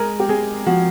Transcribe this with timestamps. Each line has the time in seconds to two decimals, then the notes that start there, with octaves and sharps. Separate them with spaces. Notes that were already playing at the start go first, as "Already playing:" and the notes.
Already playing: G#3 A#4
0.20 G4
0.29 G#3 G#4
0.67 F3 F#4